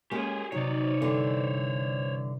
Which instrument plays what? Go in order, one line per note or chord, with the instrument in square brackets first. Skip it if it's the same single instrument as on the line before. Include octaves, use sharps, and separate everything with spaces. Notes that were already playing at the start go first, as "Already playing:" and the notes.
[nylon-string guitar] G#3 A#3 C#4 [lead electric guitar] G4 G#4
[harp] C3 D#4 [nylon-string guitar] F#3 [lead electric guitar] C#5 D5
[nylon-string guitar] G2 D3 E3